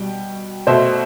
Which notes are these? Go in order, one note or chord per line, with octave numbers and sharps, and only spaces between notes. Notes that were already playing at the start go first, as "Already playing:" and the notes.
Already playing: B2 G3 G5
B2 A3 C5 E5